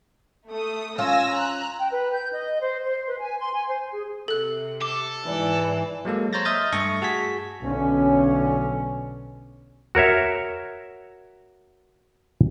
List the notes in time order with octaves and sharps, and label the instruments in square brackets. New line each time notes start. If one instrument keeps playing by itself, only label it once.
[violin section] A3 D#6
[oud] C#4 F4 [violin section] G#5 E6 A#6
[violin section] A#5 F#6
[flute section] G5
B4
G6
D#5
C5
C5
B4
G#5
C6
G#5
C5
G#4
[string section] C3 [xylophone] A4 F#6
[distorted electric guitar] A4 [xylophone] D6
[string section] G#2 D5 [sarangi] E3
[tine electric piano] F#3 G#3 A#3 A4
C5 C#5 A#5 G6 A6 A#6
D#5 E5 D#6 F6 G6 A6
G2 A3 A4 C#6 A#6
F#4 G#4 A5 G#6 B6
[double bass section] B1 B2 D3 C#4
[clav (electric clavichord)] F#4 A#4 C#5 E5